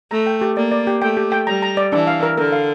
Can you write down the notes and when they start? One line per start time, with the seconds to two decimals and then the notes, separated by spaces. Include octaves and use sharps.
0.11 A3 A#5
0.27 G5
0.41 G4
0.57 A#3 D5
0.72 D5
0.87 G4
1.02 A3 G5
1.17 G4
1.32 G5
1.47 G3 A#5
1.62 A#5
1.77 D5
1.92 E3 D4
2.07 F5
2.23 A#4
2.38 D3 A#4
2.52 F5